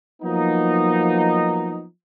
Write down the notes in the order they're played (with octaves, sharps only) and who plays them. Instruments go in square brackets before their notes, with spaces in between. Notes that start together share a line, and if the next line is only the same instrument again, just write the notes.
[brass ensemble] F3 F#3 A#3 B3 D#4